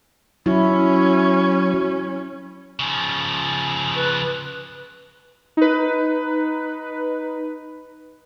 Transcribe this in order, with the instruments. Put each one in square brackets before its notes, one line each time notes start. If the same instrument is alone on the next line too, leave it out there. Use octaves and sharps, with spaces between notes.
[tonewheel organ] F#3 [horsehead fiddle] C#4 [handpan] E4
[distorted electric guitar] C#3 F3
[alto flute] B4
[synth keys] D#4 B4